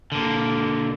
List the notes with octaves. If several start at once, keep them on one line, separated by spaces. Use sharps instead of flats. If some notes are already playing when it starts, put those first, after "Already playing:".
D3 A#3